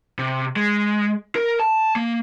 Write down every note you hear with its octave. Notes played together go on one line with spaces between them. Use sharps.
C3
G#3
A#4
A5
A#3